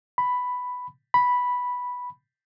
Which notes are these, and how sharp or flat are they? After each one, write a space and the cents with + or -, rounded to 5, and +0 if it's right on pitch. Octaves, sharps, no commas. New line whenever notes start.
B5 +5
B5 -5